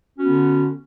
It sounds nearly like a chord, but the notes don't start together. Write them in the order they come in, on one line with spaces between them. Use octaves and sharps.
C#4 F#4 B3 D3